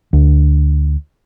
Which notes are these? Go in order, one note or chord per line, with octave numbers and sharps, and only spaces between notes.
D2